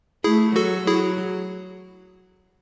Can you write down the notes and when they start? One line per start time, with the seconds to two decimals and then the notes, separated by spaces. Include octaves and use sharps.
0.24 A3 E4 G#4
0.56 F#3 F#4 A4
0.87 F#3 E4 G#4